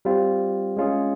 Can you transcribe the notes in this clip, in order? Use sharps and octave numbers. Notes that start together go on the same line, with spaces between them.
G3 C4 F4
G#3 C#4 F4 G#4